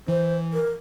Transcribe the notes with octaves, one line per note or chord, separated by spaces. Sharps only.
E3 C5
A#4